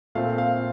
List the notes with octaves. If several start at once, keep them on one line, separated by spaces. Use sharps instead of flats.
A#2 A3 C4 F5
F5